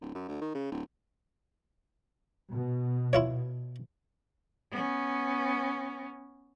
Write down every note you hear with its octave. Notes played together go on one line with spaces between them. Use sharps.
D1
F#2
D2
D#3
C#3
D1
B2
E4 F4 C#5
B3 C#4